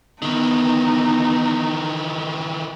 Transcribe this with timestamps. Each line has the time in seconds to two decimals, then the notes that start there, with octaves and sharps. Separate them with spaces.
0.22 D#3 E3 B3 D#4